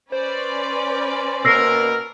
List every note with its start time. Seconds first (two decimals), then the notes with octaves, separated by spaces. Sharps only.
0.12 C#4 B4 C5 D5
1.45 B2 A#3 A#4 E6 A#6 C7